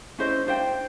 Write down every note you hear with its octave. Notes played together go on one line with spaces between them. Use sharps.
C#4 E4 C5 D#5
D4 C5 E5 G5